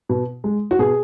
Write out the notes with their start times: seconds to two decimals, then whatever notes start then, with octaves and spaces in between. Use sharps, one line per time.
0.09 B2
0.44 G#3
0.71 F#4
0.79 B2 G#4